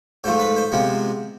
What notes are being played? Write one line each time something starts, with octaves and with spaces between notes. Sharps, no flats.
G#2 F3 A3 C5
B4
C5
C3 F3 G#3 B3